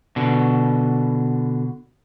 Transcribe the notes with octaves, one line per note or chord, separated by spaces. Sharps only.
B2 D3